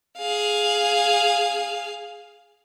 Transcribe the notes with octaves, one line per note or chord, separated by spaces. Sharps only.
G#4 F5